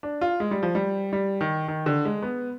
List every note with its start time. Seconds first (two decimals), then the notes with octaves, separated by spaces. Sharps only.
0.03 D4
0.21 F4
0.40 G#3
0.51 G3
0.63 F3
0.75 G3
1.13 G3
1.41 D#3
1.68 D#3
1.86 D3
2.05 G#3
2.22 B3